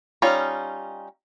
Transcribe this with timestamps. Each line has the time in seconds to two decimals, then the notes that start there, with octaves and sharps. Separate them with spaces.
0.22 G3 C#4 D#4 F4